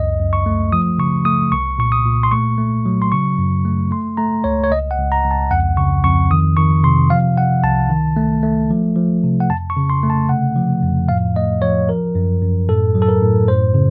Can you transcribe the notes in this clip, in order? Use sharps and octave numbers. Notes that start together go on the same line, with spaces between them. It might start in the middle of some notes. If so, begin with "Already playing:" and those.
Already playing: C#2 F#2 D#5
F#2
C#6
A3
F3 D#6
C#3 C#6
A3 D#6
C2 C#6
A#2 C#6
D#6
A#2
C6
A3 C#6
A3
F#3
C6
C#3 C#6
F#2
A3
A3 C6
A3 A#5
C#2 C#5
C#5
C#2 D#5
F#5
C#2
A#5
C#2
A5
F2 F#5
C#3 C#6
F2 C#6
D#3 D#6
D#3 C#6
C3 C6
F3 F5
C3 F#5
C2 A5
D#3
A3
A3
F3
F3
C3
F#5
F2 A5
C#6
C#3
C6
A3
A5
C3 F#5
F3
F2
A2 F5
A3 D#5
F3 C#5
F3 A#4
F#2
F#2
A2 A4
F#3
A4
A#4
A2
F#2 C5
C#3